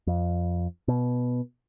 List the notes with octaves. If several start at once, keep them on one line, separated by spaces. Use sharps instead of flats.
F2
B2